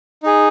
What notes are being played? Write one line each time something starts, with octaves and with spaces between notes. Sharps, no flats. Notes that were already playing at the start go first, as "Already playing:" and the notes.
D#4 G#4